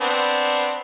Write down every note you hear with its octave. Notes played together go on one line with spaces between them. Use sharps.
B3 C4 D4